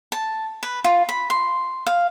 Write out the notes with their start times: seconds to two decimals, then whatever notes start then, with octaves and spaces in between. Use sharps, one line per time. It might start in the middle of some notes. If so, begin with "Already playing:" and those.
0.12 A5
0.63 B4
0.84 F4
1.09 B5
1.30 C6
1.87 F5